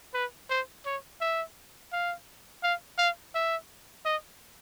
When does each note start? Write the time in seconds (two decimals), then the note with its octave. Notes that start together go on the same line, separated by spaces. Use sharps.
0.14 B4
0.50 C5
0.86 C#5
1.21 E5
1.92 F5
2.63 F5
2.98 F5
3.35 E5
4.05 D#5